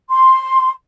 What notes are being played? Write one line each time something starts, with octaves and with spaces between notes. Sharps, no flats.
C6